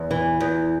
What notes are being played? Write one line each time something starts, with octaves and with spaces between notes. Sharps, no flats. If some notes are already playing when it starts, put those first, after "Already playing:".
Already playing: E2
E3
E2